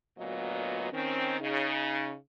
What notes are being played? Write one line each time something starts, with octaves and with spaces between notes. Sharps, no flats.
D2 A#2 F#3 B3 F4 D#5
D#3 C4 C#4
C#3 D#4